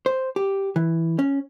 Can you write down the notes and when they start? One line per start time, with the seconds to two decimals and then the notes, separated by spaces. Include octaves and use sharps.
0.06 C5
0.36 G4
0.76 E3
1.19 C#4